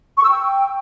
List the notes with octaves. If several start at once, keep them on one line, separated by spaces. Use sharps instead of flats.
C#6
E6
G5